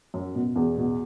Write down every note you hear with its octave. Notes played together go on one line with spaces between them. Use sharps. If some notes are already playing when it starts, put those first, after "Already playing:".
F#2
B2
E2
B2